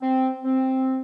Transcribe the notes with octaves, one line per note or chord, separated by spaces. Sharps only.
C4
C4